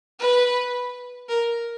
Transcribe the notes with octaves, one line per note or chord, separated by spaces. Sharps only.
B4
A#4